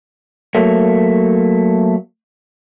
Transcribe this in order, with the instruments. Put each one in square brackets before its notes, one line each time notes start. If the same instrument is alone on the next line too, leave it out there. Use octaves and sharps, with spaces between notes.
[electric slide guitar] F#3 A3 A#3